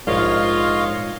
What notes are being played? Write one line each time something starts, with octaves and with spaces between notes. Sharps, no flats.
A#1 G#2 F4 C#5 D#5 F5